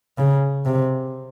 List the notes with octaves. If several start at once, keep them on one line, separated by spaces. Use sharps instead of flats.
C#3
C3